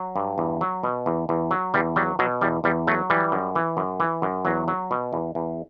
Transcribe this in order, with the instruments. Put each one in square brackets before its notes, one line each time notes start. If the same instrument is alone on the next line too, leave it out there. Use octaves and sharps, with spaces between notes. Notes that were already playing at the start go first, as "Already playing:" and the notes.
Already playing: [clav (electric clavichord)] F#3
G2
E2
F#3
B2
E2
E2
F#3
E2 G3
F#3 G3
B2 F#3
E2 G3
E2 G3
F#3 A3
E3 G3
F#2
E3
F#2
E3
F#2
E2 F#3
F#3
B2
E2
E2